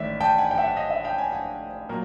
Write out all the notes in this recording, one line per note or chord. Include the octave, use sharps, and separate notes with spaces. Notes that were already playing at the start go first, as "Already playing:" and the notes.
Already playing: A1 G#2 D#3 D5 E5
G5 A5
F#5 G#5
G5
E5 F#5
F#5
D#5 F5
E5 F#5
F5 G5
F#5 G#5
F#5 G#5
A#2 F#3 A#3